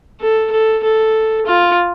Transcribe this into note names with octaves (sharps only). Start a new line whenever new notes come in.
A4
A4
A4
F4